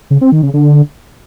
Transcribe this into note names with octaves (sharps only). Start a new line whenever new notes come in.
C#3
C4
D#3
C#3
D3